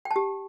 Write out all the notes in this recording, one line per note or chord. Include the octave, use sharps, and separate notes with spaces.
G5
A5
G4